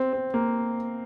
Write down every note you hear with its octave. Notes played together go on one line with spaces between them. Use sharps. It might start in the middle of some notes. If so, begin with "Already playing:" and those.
Already playing: C4
C4
A#3